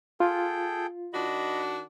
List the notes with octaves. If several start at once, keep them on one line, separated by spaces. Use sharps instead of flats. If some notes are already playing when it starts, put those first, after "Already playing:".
F4 G#4 A4 G5
D#3 D4 F#4 D#5 B5